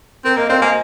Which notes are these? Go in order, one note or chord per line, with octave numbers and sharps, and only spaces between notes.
C4 A#4
A#3 A#4 D#5
C4 C5 F5
A#3 D#5 G#5